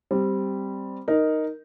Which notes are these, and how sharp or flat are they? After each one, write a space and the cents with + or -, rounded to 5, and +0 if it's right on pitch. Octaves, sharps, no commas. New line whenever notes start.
G3 +0 C4 +0
D#4 +0 A#4 +0